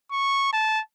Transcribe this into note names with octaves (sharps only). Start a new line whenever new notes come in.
C#6
A5